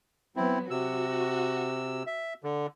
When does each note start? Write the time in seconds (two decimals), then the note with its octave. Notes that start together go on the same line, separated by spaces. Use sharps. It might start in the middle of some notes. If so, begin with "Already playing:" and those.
0.36 F#3 B3 C4 E4
0.71 C3 F#4 E6
2.07 E5
2.44 D3